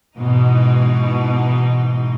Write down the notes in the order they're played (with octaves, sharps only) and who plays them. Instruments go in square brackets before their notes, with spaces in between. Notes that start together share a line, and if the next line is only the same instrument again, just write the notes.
[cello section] G#2 B2 E3 D#4